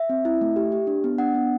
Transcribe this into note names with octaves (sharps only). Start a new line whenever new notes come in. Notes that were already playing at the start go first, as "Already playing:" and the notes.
Already playing: E5
C4
E4
A3
G4
G4
D4
B3
D4 F#5
B3